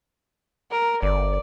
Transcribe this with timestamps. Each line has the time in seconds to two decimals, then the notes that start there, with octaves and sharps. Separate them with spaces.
0.71 A#4
1.02 G1 D5